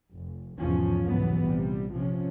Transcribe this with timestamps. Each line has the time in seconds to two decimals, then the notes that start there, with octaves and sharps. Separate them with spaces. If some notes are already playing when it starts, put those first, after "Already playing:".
0.13 F1
0.58 G#1 E2 B2 F3 C#4
1.07 C2 G#2 B2 E3 F#3 B3
1.43 A#1 C3 G3
1.92 C3 F3 C#4